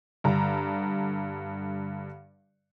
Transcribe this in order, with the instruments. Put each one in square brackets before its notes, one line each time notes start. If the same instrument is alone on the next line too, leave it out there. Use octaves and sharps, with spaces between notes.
[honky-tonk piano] G2 D3 A#5